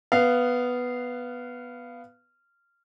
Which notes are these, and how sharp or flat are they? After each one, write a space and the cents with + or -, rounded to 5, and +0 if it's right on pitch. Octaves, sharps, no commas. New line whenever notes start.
B3 +0 F5 -15